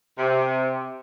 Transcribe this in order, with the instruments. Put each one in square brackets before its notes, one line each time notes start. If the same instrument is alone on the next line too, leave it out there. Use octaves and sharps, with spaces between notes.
[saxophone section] C3